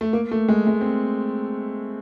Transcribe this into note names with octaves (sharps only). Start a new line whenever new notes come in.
A3
A#3
A3
G#3
G#3
C4